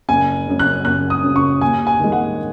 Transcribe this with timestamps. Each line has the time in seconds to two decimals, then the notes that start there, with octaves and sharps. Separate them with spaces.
0.09 F#1 G#5
0.47 F#2 C#3
0.59 F#6
0.85 F#1 F#6
1.10 D#6
1.23 F#2 C#3
1.36 C#6
1.61 D#2 G#5
1.87 G#5
2.00 D#3 G#3
2.12 F#5